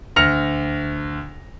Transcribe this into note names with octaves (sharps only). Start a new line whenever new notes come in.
D2 F6 A#6 C#7 F7